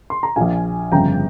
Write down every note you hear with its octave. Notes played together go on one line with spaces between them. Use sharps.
C6
A#5
A#1 A#2 F5 G#5
G1 F2 C#3 G5 A#5